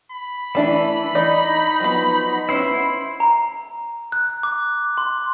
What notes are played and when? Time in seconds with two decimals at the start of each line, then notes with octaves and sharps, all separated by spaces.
0.11 B5
0.55 E3 A3 D4 E4
1.15 D#4 D5 D#5
1.80 F3 F#3 B3
2.49 B3 C#4 E4 C5
3.20 A#5
4.12 F#6
4.43 D6
4.98 C6